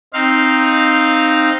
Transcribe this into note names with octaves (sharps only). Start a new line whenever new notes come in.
C4 D#4 F5